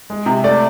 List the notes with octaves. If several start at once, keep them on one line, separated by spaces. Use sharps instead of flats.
G#3
C3
A3 D5